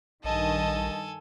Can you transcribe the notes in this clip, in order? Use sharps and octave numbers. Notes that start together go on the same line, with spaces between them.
A#1 G2 D#3 A4 D#5 G#5 A5